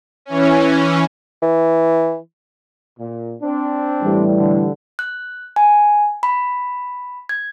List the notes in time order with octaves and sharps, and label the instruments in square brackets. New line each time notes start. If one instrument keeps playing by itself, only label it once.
[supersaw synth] E3 C#4
[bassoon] E3
[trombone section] A#2
C4 D4
[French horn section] A2 E3 G3
[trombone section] D3
[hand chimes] F#6
G#5
B5
G#6